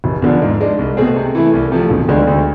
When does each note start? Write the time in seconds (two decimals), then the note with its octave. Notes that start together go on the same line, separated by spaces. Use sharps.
0.04 F1
0.22 E2 D3 F3
0.42 G#2
0.61 G#3 D4
0.79 C2
0.97 B2 A3 C4 G#4
1.16 C3
1.35 E3 A3 E4
1.54 C2
1.72 C3 F3 A3
1.90 E1
2.08 D2 D3 G#3
2.27 D2